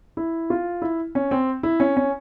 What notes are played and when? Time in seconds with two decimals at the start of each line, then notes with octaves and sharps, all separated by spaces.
0.17 E4
0.50 F4
0.82 E4
1.15 C#4
1.31 C4
1.63 E4
1.80 C#4
1.97 C#4